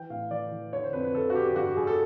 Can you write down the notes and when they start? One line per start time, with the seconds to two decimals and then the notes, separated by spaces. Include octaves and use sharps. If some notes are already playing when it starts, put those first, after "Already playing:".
Already playing: E3 G5
0.10 A2 F5
0.31 E3 D5
0.52 E3
0.73 D3 C#5
0.84 C5
0.93 F2 B4
1.04 B4
1.14 D3 A4
1.30 F#4
1.35 D3 G4
1.48 G4
1.56 G2 F#4
1.67 G4
1.76 G2 G#4
1.87 A4